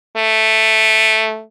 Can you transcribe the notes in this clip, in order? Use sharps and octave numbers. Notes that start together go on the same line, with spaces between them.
A3